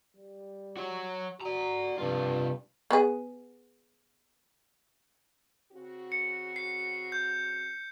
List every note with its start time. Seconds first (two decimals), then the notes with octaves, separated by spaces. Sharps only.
0.17 G3
0.77 F#4 C#5
1.41 F#4 D5 A#5
1.98 G2 C3 F4
2.91 B3 G#4
5.72 C#3 C4 F#4
6.12 C#7
6.56 C7
7.12 G6